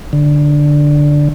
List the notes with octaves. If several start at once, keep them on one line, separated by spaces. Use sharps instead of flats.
D3